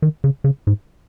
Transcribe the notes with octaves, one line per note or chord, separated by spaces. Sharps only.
D#3
C#3
C#3
G#2